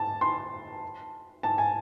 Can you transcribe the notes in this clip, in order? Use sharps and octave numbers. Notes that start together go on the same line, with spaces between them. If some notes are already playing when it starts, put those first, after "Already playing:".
Already playing: A5
C6
A5
G#5